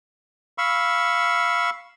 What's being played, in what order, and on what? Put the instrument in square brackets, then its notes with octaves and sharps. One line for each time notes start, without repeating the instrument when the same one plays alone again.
[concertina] F5 B5 C#6 E6